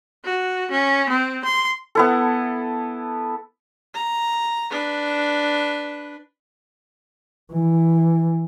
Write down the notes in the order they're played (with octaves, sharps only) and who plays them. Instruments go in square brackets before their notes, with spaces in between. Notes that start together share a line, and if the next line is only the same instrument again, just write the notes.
[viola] F#4
C#4
C4
C6
[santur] B3 E4 A4
[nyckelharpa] A#5
D4 B4
[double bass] E3